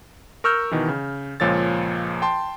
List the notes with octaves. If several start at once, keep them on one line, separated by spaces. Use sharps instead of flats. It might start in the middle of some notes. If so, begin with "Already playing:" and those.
A#4 C#6 E6 F6 G6
B2 D#3 E3
C#3
C#2 A#2 F3 C#5 E6 A6
G5 A5 C6